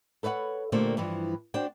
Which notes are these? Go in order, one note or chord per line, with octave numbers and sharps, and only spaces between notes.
A4 B4 C#5 E5 F#5
A#2 D3 A3 A#3 G4 C5
G2 E3 F3
D4 F#4 C5 G5